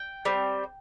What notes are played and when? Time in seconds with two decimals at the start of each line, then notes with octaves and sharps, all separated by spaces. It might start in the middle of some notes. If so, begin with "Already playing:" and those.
Already playing: G5
0.25 G3 C4